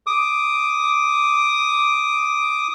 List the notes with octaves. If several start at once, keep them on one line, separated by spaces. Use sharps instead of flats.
D6 D#6